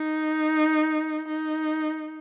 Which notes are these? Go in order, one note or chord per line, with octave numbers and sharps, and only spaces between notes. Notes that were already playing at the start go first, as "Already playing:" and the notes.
Already playing: D#4
D#4